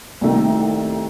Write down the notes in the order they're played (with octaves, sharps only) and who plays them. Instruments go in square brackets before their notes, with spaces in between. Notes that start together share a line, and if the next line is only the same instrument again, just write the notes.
[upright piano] C2 C3 D#3 A3